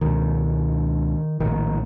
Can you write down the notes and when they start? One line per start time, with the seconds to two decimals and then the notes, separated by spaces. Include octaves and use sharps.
0.01 C#2 B2 D#3
1.40 A#1 A2 D#3